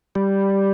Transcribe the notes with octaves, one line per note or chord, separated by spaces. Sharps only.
G3